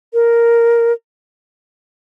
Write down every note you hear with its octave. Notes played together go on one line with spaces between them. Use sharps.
A#4